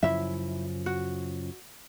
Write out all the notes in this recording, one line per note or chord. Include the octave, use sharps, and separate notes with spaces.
F#2 C#3 F3 E4 E5
F#4